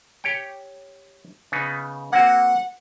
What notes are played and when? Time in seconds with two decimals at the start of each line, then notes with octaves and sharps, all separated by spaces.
0.24 G4 C#5 G5
1.52 C#3 B3 D#4
2.12 A#3 C4 F#4 F#5